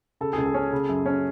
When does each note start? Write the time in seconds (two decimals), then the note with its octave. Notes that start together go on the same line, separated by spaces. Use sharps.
0.21 C#3 A4
0.33 C#2 G#4
0.46 A4
0.54 C#4
0.72 C#3
0.89 F#2
1.06 C#4